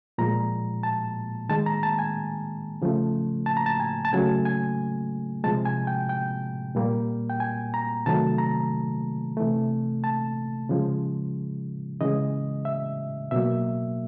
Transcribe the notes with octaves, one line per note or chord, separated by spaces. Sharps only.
A#2 F3 G#3 A#5
A5
D#3 G#3 A5
A#5
A5
G#5
C#3 F3 A3
A5
A#5
A5
G#5
A5
C#3 F#3 A3 G#5
G#5
C3 F3 G#3 A5
G#5
G5
G5
A#2 G3 A#3
G5
G#5
A#5
C3 D#3 F#3 A3 A5
A#5
C3 E3 A3
A5
C#3 F3 G#3
C#3 E3 G#3 D#5
E5
B2 F#3 A#3 E5